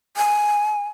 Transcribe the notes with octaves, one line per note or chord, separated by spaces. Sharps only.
G#5